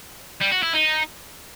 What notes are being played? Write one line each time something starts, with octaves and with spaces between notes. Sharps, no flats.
G3
F#4
E4
D#4